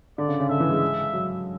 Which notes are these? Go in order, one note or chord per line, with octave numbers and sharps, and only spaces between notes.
D3 D5
C#3
C#3
D3 E5
E3
G#3
F#3